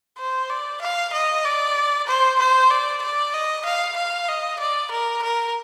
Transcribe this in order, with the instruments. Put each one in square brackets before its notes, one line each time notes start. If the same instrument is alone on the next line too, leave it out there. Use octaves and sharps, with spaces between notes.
[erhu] C5
D5
F5
D#5
D5
C5
C5
D5
D5
D#5
F5
F5
D#5
D5
A#4
A#4